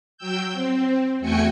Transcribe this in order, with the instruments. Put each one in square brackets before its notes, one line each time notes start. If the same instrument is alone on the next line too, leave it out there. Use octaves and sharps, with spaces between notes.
[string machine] F#3 G5 E6 G6
C4
E2 A3 F#4 G5 G#5 C#7